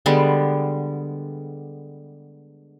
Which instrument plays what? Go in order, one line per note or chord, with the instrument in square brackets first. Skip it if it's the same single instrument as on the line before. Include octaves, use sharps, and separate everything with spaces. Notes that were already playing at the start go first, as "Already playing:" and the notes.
[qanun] D3 G3 G#3 B3